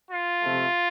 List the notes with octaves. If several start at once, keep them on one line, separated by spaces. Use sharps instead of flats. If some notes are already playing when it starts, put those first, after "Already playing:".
F4
C3 F3 A3